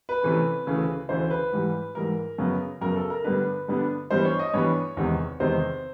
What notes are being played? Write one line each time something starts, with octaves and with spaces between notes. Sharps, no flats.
B4
C3 E3 A3 C#4
D2 C#3 E3 A3
D2 C#3 E3 A3 C5
B4
G#2 E3 G3
G#2 E3 G3 A#4
F#2 C#3 F#3 B3
F#2 C#3 F#3 B3 A#4
A4
A#4
G2 D3 G3 B3 D4 B4
G2 D3 G3 B3 D4
G2 E3 G3 B3 D4 C5
C#5
D#5
G2 E3 G3 B3 D4 C#5
E2 C3 D#3 G#3
E2 C3 D#3 G#3 C5